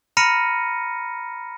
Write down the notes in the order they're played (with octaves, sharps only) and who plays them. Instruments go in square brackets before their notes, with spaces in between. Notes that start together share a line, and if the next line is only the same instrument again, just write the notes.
[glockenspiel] A#5 B5 F6 A#6 C#7 D#7